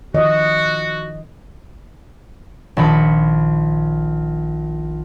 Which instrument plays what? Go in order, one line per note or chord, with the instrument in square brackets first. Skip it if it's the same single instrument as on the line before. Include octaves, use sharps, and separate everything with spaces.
[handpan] D#3 F3 D#5 [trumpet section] F#4
[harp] A#1 D#3 B5 C#7